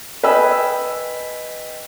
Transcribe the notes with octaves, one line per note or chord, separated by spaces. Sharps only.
B4 D#5 G5 G#5 E6